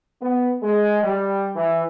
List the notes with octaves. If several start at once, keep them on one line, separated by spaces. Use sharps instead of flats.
B3
G#3
G3
E3